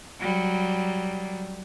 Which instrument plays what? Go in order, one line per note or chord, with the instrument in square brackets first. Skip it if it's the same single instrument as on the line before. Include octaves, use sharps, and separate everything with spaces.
[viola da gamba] F#3 G3